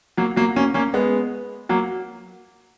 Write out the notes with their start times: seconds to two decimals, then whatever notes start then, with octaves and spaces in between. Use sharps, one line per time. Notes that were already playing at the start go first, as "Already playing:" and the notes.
0.17 F#3 A#3
0.36 F#3 A#3
0.56 A#3 C#4
0.74 A#3 C#4
0.94 G#3 B3
1.69 F#3 A#3